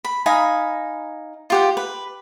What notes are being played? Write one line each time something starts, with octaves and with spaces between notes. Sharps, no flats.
B5
D#4 F5 G#5 B5
F4 G4 F#5
B4